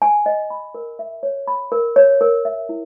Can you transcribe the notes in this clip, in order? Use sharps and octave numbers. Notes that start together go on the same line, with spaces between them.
G#5
D#5
B5
A#4
E5
C#5
B5
A#4
C#5
A#4
E5
E4